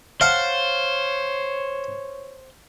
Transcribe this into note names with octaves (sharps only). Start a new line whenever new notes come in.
C5 C#5 F5 F#5 A5